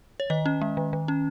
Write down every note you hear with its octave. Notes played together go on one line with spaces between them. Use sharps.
C#5
D#3 D#5
C#4
G#3
D#3
D#3
C#4